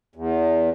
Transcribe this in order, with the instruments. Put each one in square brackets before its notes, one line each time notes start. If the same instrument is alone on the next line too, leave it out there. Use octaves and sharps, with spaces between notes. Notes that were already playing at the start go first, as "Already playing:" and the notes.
[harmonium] E2